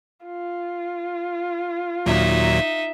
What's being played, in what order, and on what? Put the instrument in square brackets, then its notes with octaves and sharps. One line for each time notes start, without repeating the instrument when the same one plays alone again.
[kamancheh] F4
[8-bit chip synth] D#2 A#2 F#3 [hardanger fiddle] D#4 E5